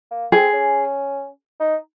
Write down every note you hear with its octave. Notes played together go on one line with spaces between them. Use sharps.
A#3
C4 G#4
C#4
D#4